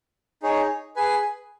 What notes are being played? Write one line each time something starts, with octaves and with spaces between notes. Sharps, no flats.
D#4 G#4 C#5
G#4 B4 G#5